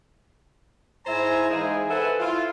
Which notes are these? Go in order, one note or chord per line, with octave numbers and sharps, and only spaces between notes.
G#2 E4 C5 E5 G#5 A#5
E3 G#3 A#3 D#4 G#4 C5
A4 B4 C5 E5 F#5 G#5
E4 F4